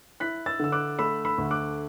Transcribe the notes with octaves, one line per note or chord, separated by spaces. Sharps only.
E4 F#6 B6
E6 A6
D3 E6
D6 F#6
A3 B5 E6
B5 E6
D2
D6 F#6